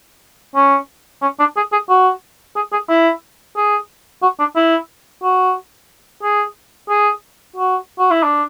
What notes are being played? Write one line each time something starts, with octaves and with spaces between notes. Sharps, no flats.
C#4
C#4
D4
G#4
G#4
F#4
G#4
G#4
E4
G#4
F#4
D4
E4
F#4
G#4
G#4
F#4
F#4
E4
D4